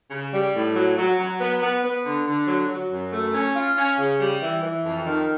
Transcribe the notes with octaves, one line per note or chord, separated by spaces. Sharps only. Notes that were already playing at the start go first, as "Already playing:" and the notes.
C#3
G3
A2
F#3
F#3
F#3
B3
B3
B3
D3
D3
F#3
F#3
F#2
A3
C#4
F4
C#4
C#3
G3
E3
E3
F2
D#3